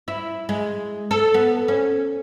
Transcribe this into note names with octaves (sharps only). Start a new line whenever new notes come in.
E4
G#3
A4
B3
C#4